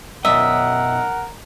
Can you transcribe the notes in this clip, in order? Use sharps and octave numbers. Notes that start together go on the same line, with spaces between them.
B1 F#2 A#4 D#5 E5 F#5